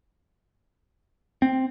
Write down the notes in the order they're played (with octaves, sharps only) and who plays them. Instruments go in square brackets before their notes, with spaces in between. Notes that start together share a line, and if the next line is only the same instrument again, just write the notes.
[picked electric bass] C4